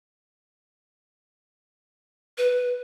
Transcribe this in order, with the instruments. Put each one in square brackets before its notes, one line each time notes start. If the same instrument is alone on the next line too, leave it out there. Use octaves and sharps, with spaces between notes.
[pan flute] B4